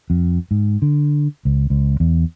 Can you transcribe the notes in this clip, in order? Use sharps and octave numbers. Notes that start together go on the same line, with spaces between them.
F2
G#2
D3
C#2
C#2
E2